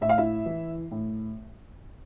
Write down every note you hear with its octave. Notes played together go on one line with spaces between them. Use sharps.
A2 E5
F5
E4 E5
E3
A2